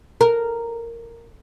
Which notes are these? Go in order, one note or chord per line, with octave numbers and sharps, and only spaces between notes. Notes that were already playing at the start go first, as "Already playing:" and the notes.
A#4